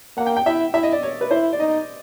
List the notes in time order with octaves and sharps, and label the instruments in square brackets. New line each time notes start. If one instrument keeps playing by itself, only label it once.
[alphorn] A#3 [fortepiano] F#5
[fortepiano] G5
G5
[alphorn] E4 [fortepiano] E5
[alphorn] E4 [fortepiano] E5
[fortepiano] D#5
D5
C#5
B4
[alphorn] E4 [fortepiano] C5
[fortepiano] D5
[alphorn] D#4 [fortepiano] D#5